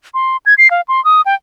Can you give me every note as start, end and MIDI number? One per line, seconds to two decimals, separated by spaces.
0.14 0.37 84
0.46 0.54 92
0.58 0.70 96
0.71 0.81 77
0.88 1.03 84
1.05 1.21 87
1.26 1.35 79